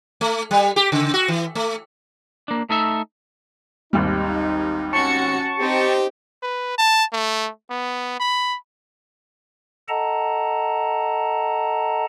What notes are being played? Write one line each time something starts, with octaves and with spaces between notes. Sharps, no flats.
A3
G3
G4
C#3
F#4
E3
A3
A#3 D4
A3 D#4 A4 E5
G#1 D#2 G3 D#4
C#4 F#4 A5 C#6 C#7
C4 D#4 G4
B4
A5
A3
B3
B5
A4 D#5 F#5 A5 A#5